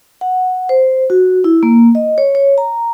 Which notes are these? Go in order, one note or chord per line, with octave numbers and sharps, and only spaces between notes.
F#5
C5
F#4
E4
A#3
D#5
C#5
C#5
A#5